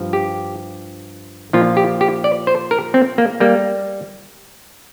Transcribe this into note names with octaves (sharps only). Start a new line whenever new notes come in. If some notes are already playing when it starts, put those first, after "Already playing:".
Already playing: G2 F3
G4
A#2 F3 F4
G4
G4
D5
C5
A#4
C4
A#3
G3 A#3